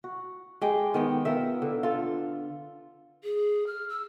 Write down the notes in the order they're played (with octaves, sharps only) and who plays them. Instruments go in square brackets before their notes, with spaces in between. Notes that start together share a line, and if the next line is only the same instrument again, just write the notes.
[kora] F#4
G#3 G4 G5
D#3 B3 G5
B3 F4 A#4 E5
D3
F4 A4
[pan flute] G#4
F6
E6